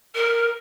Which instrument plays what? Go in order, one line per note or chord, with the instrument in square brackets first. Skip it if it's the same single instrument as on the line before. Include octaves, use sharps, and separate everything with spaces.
[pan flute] A#4